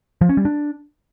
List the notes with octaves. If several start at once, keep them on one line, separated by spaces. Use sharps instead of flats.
F3
C#4
G3
D4